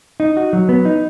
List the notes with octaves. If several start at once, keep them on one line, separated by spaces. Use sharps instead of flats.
D#4
F#4
F#3
B3
D#4